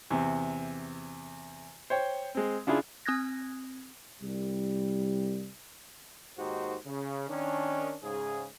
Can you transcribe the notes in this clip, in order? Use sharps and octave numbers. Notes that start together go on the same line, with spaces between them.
E2 C3
C5 C#5 G5
G#3 C4
C#3 D4 E4 F4 G#4
C4 D#6 F#6 G#6 A#6
C2 G3
D#2 G#2 D#4 F#4 G4 C5
C#3
D#3 C#4 D4
G#2 C#3 G#4